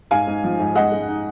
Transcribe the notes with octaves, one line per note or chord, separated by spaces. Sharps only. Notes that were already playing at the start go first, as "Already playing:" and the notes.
G#2 F5 G#5
G#2
F3
G#2
G#3 D#5 F#5
G#3
D#4